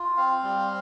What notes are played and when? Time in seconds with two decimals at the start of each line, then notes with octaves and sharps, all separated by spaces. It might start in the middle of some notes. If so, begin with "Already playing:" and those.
Already playing: F4
0.17 C4 F5
0.43 G3